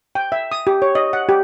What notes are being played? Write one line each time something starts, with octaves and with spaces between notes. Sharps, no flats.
G5
E5
D#6
G4
C#5
D#5
F#5
G4